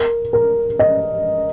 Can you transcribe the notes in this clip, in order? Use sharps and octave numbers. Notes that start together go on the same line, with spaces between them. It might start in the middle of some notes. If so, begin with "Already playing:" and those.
Already playing: A#4
A#4
D#5